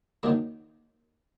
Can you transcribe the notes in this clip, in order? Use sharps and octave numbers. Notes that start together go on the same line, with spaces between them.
D#3 F#3 A#3 D4